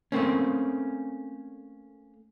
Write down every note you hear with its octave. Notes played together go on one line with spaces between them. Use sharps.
A3 A#3 C4 C#4